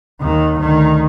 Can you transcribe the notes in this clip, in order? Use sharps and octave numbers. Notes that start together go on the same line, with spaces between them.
D#2 D#3
D2 D#3